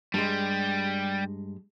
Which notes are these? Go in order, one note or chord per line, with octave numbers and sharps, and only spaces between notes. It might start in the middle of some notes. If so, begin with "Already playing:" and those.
G2 G3 G#3